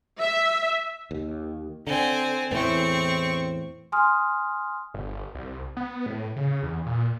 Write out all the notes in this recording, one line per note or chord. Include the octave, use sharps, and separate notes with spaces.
E5
D#2
D3 C4 G#5
E2 A2 E3 C4 C#6
G#5 C6 D#6 F6
G1
C2
B3
A2
C#3
E2
A#2